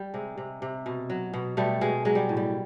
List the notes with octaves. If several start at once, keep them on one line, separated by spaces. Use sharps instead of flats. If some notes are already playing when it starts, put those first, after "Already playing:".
Already playing: G3
C3 G#3
C3
C3
B2
F#3
B2
B2 G3 A3
B2 G#3
F#3 G#3
G3
A2
G3